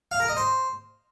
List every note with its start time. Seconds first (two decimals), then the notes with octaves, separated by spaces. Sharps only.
0.12 F5
0.20 A#4
0.28 D#5
0.37 C5